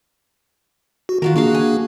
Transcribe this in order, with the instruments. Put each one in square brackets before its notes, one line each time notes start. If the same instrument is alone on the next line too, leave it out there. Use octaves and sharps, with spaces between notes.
[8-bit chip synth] F#4
[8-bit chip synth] D#3 [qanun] F4 F#4 A#4
[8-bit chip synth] A#3 D4 G#4 [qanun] F#4 F5
[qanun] G#5